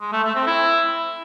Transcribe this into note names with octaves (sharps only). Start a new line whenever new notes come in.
G#3
A3
A3
C4
E4